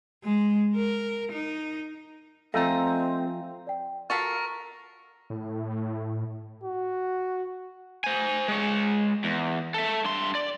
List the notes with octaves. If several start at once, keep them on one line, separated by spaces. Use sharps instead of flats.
G#3
A#4
D#4
F3 A3 C4 D#5 G#5 A#5
D5 G5
F4 F#4 A4 A#4 C#6 A6 B6 C7
A2
F#4
C5 G#5
G#3 C#5
E2
A4 E5
G2 C6
D5